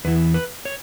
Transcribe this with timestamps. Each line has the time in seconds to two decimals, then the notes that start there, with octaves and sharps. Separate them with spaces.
0.05 E2 E3 B4
0.34 B4
0.65 C#5